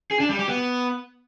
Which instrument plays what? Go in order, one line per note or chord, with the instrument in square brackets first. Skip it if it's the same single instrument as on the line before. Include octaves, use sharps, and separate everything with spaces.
[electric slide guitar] G#4
D4
G3
G4
B3